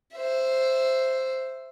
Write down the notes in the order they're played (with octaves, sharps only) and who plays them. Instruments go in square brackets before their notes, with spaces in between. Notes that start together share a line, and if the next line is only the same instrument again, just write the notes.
[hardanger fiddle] C5 E5